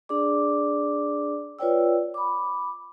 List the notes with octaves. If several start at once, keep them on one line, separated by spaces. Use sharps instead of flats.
D4 G#4 D5 D6
F4 B4 C#5 D5 G5 E6
B5 D6